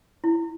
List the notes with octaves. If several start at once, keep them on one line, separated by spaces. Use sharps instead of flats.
E4